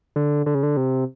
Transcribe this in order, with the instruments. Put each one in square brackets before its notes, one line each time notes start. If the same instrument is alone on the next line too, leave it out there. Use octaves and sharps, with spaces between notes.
[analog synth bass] D3
D3
C#3
D3
C3